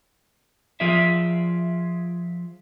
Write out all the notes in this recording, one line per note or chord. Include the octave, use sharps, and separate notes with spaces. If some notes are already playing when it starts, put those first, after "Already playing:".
F3 F4 G#4 D5 E5